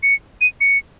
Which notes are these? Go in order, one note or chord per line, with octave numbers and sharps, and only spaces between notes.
C#7
D#7
C#7